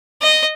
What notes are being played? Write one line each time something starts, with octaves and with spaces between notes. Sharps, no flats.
D#5